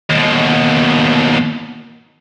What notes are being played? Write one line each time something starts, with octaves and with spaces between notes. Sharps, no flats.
D#2 B2